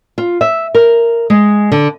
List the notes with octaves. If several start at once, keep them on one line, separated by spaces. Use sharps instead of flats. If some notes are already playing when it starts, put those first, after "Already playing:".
F4
E5
A#4
G#3
D3